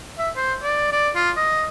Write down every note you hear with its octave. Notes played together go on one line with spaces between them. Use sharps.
E5
C5
D5
D5
F4
D#5